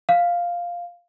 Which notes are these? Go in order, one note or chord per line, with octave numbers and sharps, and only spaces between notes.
F5